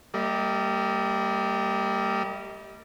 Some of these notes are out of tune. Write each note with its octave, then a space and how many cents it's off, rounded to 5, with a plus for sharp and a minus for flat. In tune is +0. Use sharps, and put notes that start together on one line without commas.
G3 +0 A#3 -35 D#5 +35